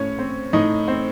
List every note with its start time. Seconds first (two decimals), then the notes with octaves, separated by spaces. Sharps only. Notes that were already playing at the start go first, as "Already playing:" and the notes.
Already playing: A2 C#4 C#5
0.19 C4
0.53 A2 D#4 D#5
0.88 C4